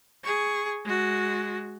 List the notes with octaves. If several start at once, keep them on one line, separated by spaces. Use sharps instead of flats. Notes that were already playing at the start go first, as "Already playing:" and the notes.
G#4 C#6
G#3 F#4